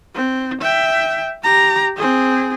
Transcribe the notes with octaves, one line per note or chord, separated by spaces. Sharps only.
C4
E5 G5
G4 A#5
C4 G#4